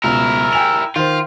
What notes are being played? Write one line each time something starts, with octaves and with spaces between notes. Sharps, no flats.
C#2 B2 E4 A#4
G5 G#5 F7
D#3 F4 C5